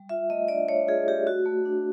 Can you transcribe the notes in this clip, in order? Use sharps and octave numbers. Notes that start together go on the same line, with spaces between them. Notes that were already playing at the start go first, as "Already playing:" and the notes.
Already playing: G3
F4 E5
A3 D#5
D4 D5
A3 C#5
F4 G#4
A3 G4
F#4
A3
D4